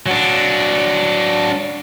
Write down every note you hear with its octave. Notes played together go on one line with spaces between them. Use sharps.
F#3 D4